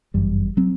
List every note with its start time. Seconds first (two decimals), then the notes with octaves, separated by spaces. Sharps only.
0.14 G1 F#2 E3 G3
0.57 F#3 C4